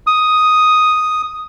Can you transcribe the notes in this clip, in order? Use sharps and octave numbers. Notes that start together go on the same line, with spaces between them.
D#6